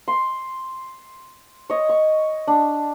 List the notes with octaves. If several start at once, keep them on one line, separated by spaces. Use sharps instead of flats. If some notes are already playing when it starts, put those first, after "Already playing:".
C6
C#5 D#5
C#6
D4